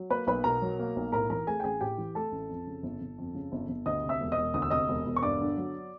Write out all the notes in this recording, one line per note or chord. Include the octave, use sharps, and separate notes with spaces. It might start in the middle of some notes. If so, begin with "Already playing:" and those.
Already playing: F#3
A#3 B4 B5
B1 B4 B5
B2 A#4 A#5
F#3
A#3
B1
A2 A#4 A#5
E3 A#4 A#5
A3 G#4 G#5
G5
A1 G#4 G#5
A2 G4 G5
E3
A3 A4 A5
A1
F2
C#3
G1
G1
F2
C#3
G1
G1
D2 D#5 D#6
C3
E5 E6
E1
D#5 D#6
E1
D2 D#6
E6
C3 D#5 D#6
E1
E1
C#6
G2 D5 D6
D3
F#3